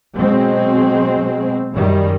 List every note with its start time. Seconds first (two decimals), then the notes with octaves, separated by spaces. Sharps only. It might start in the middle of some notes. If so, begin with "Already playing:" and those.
0.15 B2 F#3 G#3 C4
1.74 F#2 D#3 G3